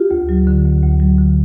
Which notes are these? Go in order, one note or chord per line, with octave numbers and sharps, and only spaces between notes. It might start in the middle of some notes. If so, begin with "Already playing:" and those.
Already playing: F4 G4
D2
F#3
D3
D2
D2
F#3
D3